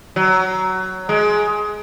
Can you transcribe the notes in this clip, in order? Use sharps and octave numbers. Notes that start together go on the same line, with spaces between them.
F#3
G#3